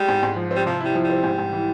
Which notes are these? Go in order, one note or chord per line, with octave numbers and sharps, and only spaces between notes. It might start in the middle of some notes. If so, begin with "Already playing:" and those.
Already playing: G3 G#3
G#2
G#2
F3
C4
G3
C3 F3
G3 E4
F3
G3
C4
G#2
G#2
E3